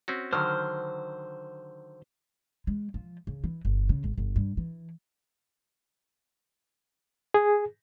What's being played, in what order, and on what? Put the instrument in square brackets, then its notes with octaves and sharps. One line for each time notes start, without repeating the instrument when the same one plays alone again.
[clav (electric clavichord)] C4 C#4 F#4
[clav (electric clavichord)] D3 D#3 F#3 [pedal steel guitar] C5 F6
[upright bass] G#3
F3
C#3
E3
G1
C#3
G#1
G1
G2
E3
[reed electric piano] G#4